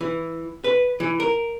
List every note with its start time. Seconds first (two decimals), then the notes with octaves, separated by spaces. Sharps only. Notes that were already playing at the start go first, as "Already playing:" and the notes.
0.01 E3
0.64 B4
1.00 E3
1.20 A#4